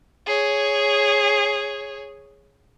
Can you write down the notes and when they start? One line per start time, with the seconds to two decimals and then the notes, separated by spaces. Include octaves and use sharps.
0.26 G#4 C#5